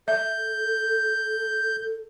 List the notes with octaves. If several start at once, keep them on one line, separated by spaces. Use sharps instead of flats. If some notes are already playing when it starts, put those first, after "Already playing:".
A4 E5 G6